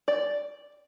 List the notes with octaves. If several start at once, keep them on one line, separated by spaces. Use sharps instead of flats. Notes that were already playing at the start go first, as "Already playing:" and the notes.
D5